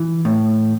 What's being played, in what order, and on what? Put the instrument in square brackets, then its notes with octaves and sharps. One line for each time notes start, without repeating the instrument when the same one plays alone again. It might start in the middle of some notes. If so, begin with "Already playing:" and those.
Already playing: [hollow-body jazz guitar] E3
A2